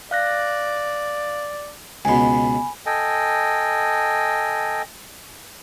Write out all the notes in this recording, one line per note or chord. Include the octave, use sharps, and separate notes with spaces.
D5 F5 F#6 A#6
C#2 B2 G#5 B5
A4 D#5 G5 G#5